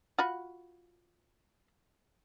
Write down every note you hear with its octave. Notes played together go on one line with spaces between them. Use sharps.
F4 F#4 B5